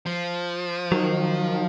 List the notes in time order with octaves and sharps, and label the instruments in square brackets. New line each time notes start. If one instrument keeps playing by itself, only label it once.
[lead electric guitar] F3
[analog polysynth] D#3 [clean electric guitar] F#3